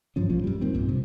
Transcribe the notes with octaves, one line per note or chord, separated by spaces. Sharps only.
G2 E3 F3 C#4
B1 A#2 F3
F#2 G3
F#1 A#2 D#3 C4
B1 G2 A#2
C3